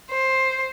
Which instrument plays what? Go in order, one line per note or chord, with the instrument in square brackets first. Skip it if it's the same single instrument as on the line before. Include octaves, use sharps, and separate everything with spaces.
[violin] C5